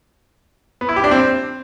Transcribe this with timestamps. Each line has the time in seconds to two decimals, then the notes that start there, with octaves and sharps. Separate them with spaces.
0.81 B3
0.89 E4
0.96 G4
1.04 D4
1.11 C4